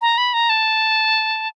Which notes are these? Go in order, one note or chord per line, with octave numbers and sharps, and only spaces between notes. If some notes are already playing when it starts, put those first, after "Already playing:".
A#5
B5
A#5
A5